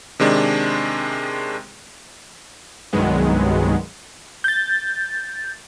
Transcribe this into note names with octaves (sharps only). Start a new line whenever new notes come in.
C3 D#3 G#3 D4
C2 G2 D#3 F#3 G#3 B3
G6 A6